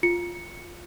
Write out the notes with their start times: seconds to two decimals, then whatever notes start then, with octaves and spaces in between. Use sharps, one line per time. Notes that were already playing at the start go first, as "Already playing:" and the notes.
0.03 F4 C#7